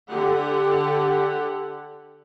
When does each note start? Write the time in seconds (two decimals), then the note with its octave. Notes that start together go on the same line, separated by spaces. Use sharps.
0.11 D3 G4 F#5